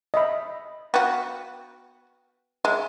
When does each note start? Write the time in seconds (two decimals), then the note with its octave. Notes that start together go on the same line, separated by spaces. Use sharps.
0.14 D#5 E5 B5
0.94 B3 F#4 F5 G5
2.65 G#3 E5